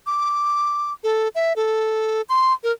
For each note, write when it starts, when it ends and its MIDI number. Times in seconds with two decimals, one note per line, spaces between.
0.07 0.93 86
1.04 1.28 69
1.35 1.53 76
1.56 2.22 69
2.29 2.53 84
2.63 2.72 70